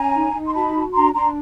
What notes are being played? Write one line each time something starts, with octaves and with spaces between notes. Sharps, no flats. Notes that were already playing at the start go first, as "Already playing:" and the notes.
Already playing: C#4 G#5 A#5
D#4
D#4
C6
F#4 A5 B5
F#4
D4 A#5 C6
D4 A#5 C6